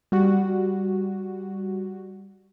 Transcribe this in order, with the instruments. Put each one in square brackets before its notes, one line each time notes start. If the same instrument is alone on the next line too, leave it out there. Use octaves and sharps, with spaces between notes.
[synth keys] G3 F#4